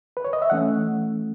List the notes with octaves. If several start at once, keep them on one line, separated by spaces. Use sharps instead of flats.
B4
C#5
D#5
E5
E3 A3 C#4 F#5